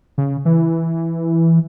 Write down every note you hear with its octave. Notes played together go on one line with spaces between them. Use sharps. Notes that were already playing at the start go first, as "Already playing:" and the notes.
C#3
E3